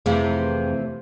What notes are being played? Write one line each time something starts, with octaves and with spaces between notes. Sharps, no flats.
F2 C3 E3 A3 G#4 F5